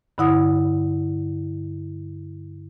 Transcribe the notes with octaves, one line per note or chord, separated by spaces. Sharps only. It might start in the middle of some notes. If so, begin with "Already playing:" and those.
G2 D3 E4 F#5 D#6